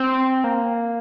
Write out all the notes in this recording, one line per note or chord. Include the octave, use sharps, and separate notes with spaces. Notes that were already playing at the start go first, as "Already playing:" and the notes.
Already playing: C4
A#3